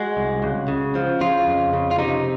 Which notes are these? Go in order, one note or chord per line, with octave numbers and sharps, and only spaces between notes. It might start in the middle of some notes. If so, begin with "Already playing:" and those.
Already playing: G#3 F#4
C2
C#2
C#3
F3
C#3 F4
F2
C#3
F4
C3 D#4